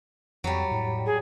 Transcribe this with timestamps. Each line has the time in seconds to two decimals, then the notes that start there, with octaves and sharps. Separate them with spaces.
0.44 F2 F#3 G3
0.71 A2
1.06 G#4